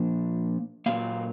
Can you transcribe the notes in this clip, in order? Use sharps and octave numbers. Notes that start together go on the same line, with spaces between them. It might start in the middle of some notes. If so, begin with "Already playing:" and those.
Already playing: A#2 F3 A#3 D4
A#2 F#3 A#3 F5